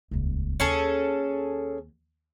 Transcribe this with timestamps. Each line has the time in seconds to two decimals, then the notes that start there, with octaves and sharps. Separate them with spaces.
0.11 D#1 C#2
0.60 D#2 C#4 G#4 A4